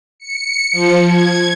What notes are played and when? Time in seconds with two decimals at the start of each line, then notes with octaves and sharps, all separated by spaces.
0.19 C#7
0.72 F3
1.06 G#6